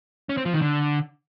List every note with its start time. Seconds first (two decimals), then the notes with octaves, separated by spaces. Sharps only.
0.29 C#4
0.37 C4
0.45 F3
0.53 D#3
0.61 D3